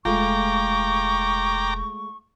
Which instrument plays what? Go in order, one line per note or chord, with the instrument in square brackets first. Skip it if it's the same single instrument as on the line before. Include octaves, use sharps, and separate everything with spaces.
[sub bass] E1 [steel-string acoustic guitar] G#3 A3 F4 [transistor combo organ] G5 A#5 D6 [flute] C#6